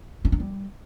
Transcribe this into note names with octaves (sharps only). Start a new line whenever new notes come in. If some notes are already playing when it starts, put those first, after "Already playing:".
C#4
D4
G3